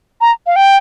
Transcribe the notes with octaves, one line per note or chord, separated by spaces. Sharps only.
A#5
F5
G5